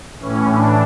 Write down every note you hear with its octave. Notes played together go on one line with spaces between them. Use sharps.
A2 E3 C#4
D4